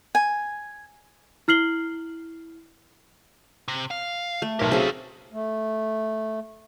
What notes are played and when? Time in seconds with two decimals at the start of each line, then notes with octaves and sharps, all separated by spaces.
0.15 G#5
1.48 E4 F6 C7 F#7 G7
3.68 C3
3.91 F5
4.42 A3
4.59 B1 C#4 G4 A#4
4.71 C#3 F#3 C4 G#4 A4
5.33 A3